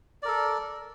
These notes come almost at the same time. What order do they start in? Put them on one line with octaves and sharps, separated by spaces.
D5 A#4 A4